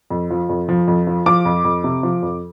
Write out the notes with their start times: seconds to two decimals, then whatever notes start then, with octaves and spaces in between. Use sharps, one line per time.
0.10 F2
0.30 F3
0.49 F2
0.69 F3
0.88 F2
1.07 F3
1.26 F3 D6
1.45 F2
1.64 F2
1.84 C3
2.03 F3
2.23 F2